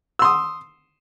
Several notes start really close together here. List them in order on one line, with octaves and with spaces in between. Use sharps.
E6 C6 D#6